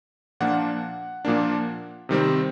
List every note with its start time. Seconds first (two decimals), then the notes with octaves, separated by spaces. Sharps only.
0.40 A#2 F3 A#3 D4 F#5
1.25 A#2 F3 A#3 D4
2.09 C3 D#3 G3 C4